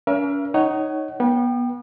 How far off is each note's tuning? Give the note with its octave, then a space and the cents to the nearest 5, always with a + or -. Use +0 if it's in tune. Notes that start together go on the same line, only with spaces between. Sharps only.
C#4 +40 A#4 +40 E5 +40
D#4 +0 C#5 +0 F#5 +35
B3 -30 G5 +0